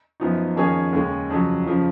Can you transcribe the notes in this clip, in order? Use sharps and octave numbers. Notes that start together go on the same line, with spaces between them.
F#2 F3 B3 D#4
F2 D#3 A#3 C#4 G#4
D#2 C#3 G#3 C#4
F2 C#3 F#3
F2 C#3 F3